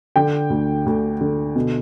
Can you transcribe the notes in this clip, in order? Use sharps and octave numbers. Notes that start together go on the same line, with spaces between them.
D3 G5
D2
D2
D3
B2